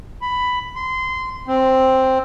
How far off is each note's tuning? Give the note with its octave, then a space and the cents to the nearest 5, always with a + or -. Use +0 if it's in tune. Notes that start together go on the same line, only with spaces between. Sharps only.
B5 +10
C6 -20
C4 +5